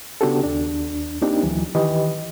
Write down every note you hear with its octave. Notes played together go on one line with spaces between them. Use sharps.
C#3 B3 D4 F#4 G4 A4
D#2 D4
A#3 C4 D4 D#4 G4
D2 E3 F#3
D#3 E3 G4 B4 D#5